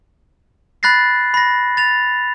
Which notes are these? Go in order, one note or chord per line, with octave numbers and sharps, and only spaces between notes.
B5 F#6 A6 A#6 C7
B5 A#6
A6 F7